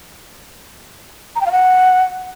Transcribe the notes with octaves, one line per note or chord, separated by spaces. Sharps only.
A#5
G5
F5
F#5